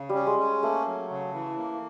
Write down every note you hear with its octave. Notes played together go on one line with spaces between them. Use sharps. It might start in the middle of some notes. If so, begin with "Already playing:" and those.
Already playing: C#3
G3
C#4
G#3
C#4
A3 A#3
F#3
C#3
E3
A#3